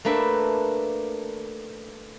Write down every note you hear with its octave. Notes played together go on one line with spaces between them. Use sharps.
A3 A#3 D4 B4 E5